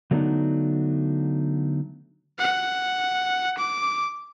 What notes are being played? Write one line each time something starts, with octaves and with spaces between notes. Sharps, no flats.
D3 F#3 A3 B3 D4 D#4
F#5
D6